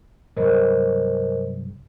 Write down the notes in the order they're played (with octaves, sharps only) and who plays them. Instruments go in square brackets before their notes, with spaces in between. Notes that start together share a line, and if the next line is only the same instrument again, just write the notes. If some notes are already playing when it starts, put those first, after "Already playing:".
[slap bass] C2 G2 F#3 [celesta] A#4 C5 D#5